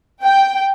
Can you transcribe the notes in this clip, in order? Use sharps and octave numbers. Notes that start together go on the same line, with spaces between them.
G5